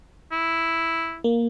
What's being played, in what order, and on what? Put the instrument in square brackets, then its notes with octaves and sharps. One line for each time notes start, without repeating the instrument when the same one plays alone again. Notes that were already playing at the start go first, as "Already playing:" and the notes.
[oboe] E4
[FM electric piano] A#3